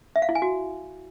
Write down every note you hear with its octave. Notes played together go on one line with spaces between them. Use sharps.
E5
F5
E4
G#5
F#4